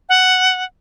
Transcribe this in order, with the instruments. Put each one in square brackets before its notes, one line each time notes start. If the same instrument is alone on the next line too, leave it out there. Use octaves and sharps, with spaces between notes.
[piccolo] F#5